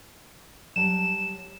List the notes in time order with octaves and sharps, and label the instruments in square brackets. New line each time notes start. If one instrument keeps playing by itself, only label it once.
[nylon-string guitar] F#3 G3 A5 [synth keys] E7